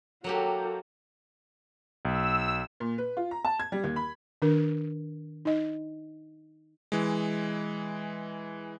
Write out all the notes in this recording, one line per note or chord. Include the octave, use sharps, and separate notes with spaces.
F#3 A#3 F#4 G4 A4
B1 E6
A#2
B4
F4
A#5
A5
G#6
G3
D#2
B5
D#3 D4 A#4
D#4 D#5
E3 G#3